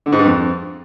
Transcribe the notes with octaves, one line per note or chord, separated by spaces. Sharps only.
D3
G#2
G2
F2